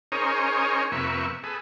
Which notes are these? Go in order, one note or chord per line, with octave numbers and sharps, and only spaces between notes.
C#4 D#4 G#4 A#4 C5 C#5
F2 C3 A#3 B4 E5 C#6
G#4 A4 B4